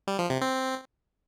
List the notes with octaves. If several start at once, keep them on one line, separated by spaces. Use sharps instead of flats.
G3
F3
C3
C4